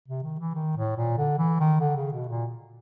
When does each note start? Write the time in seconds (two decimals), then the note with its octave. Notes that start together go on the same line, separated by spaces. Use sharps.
0.08 C3
0.23 D#3
0.39 E3
0.54 D#3
0.76 A2
0.97 A#2
1.17 D3
1.38 E3
1.60 D#3
1.80 D3
1.96 C#3
2.13 B2
2.28 A#2